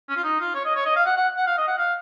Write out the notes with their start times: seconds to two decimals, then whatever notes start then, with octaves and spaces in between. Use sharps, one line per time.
0.09 C#4
0.16 F4
0.24 D#4
0.40 F4
0.54 C#5
0.65 D#5
0.75 C#5
0.85 D#5
0.96 F5
1.06 F#5
1.17 F#5
1.37 F#5
1.46 F5
1.57 D#5
1.67 F#5
1.78 F5